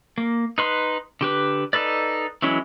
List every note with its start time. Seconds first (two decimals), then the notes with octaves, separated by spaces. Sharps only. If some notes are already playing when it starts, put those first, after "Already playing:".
0.18 A#3
0.58 D#4 B4 C6
1.21 D3 G4 B4
1.73 D#4 A4 B4 D5
2.42 E3 F#3 G#3 C#4 E4